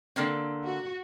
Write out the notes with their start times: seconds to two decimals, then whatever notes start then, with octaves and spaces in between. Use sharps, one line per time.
0.16 D3 A#3 C4
0.64 F#4